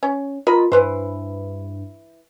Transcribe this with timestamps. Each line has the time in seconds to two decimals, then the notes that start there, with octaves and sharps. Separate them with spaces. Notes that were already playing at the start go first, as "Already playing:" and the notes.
0.03 C#4
0.47 F4 A#4 D#5 B5
0.72 G2 E3 B4 C5